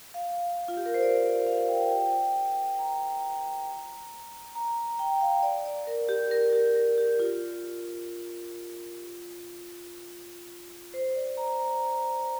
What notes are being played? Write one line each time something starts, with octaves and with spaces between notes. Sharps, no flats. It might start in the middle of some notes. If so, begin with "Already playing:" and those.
F5
F4
G4
A#4
C5
D5
D5
F5
G5
G5
A#5
A#5
G5
F5
D5
D5
A#4
G4
A#4
G4
A#4
G4
F4
C5
D5
A#5
A#5